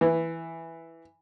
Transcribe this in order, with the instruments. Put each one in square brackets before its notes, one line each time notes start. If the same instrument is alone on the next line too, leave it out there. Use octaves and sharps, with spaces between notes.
[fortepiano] E3